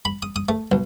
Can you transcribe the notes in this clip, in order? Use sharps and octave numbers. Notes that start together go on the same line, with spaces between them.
B5
D#6
D#6
A3
B1